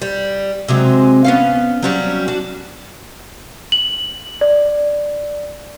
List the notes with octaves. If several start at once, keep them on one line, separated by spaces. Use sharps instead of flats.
G3
C3 F#3 G#3
B3 C#4 F5
F#3 G3 C#4
D4 F#4
F#7
D5